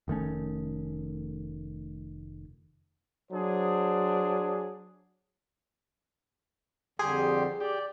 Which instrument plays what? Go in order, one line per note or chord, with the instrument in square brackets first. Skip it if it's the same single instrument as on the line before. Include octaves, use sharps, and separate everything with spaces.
[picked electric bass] F1 D#3 A3 C#4
[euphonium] F#3 [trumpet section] D4 G#4 C5
[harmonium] F2 D3 G3 [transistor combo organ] G4 C6 [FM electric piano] G#4
[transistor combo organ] G4 [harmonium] D5